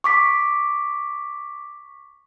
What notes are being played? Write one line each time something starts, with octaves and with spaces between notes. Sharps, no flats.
C#6 D6 B6